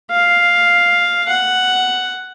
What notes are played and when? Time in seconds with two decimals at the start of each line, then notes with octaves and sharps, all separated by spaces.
0.11 F5
1.28 F#5